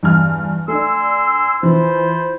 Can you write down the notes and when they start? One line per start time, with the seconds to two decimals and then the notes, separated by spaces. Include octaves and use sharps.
0.03 E2 G2 F6
0.68 A3 D4 G#5 C6 E6
1.63 E3 E4 F4 C5